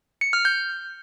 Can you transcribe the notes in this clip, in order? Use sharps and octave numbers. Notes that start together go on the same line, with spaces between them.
C#7
F6
G6